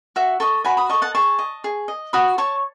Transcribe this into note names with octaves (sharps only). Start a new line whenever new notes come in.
F#4 E5
A4 D#5 A5 C#6
F#4 G#5 B5
B5 D#6
A4 D#5 A5 C#6
F#5 A5
G#4 A5 C#6
D#5
G#4
D#5
F#4 B5 D#6
C#5 A5 C#6